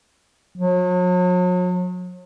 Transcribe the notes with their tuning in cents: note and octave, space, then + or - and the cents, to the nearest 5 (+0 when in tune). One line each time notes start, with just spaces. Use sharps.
F#3 -40